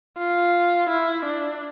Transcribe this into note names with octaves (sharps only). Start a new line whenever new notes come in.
F4
E4
D4